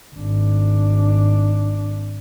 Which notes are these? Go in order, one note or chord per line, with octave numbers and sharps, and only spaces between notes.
G#1 D4